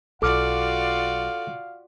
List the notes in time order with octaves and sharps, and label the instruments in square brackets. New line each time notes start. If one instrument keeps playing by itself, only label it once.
[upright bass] B1 [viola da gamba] F4 F#4 D5 [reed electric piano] A4 D6 F6 [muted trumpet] F5